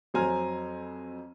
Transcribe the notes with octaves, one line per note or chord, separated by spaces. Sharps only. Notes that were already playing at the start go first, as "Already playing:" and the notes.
F2 F#3 C5 G#5 A#5 F6